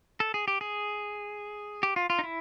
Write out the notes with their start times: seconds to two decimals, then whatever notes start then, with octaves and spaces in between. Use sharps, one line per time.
0.20 A4
0.34 G#4
0.48 G4
0.61 G#4
1.83 G4
1.96 F4
2.10 F4
2.19 D#4
2.24 E4